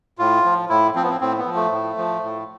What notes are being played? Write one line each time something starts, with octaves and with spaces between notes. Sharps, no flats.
A2 F4
F3
A2 E4
F3 C4
B3
C4
A2 C4
B3
F3
A3
A2
F3
A2